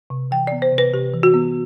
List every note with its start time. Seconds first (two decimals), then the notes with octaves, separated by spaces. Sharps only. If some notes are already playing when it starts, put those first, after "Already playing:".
0.10 C3
0.31 E3 G5
0.47 D5
0.52 B3
0.62 C5
0.72 C3
0.78 B4
0.93 C3 G4
1.13 E3
1.23 F#4
1.34 B3